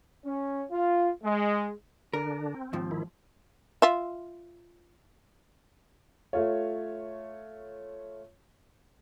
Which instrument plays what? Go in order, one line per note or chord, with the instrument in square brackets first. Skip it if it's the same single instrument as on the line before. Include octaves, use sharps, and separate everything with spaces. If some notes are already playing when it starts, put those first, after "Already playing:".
[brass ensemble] C#4
F4
G#3
[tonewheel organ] D3 D4 [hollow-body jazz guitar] A#4
[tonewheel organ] C4
[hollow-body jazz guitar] D#2 G#2 F3
[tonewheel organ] D#3 E4
[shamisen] F4 E5
[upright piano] A3 F4 C#5